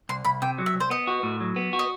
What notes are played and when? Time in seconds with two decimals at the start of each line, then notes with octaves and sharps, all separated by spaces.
0.09 C2 C6
0.24 C2 B5
0.42 C3 G5
0.58 F#3
0.66 E5
0.74 C2
0.80 C5
0.90 B3 D#5
1.07 F#4
1.23 A2
1.40 F#3
1.56 B3
1.73 F#4
1.79 D#5